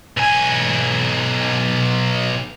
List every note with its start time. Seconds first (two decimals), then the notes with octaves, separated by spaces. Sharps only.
0.17 B1 G#5